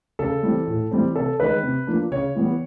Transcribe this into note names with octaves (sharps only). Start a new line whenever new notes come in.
C#3 A4
E3 G3 C4
A2
E3 G3 C4
C3 A4
D#3 G#3 B4
C3
F3 A#3 D4
C#3 C#5
E3 G3 B3